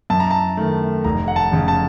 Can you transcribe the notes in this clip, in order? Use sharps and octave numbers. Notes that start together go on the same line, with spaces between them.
F#2 A5
A#5
A5
D#3 A3
F1 A#5
F#5
A5
F2 C#3
A5